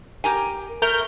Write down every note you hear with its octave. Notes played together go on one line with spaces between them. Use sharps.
G4 A#4 G#5
A3 A#4 F6 G6